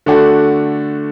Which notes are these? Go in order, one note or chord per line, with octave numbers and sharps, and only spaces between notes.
D3 A3 D4 F#4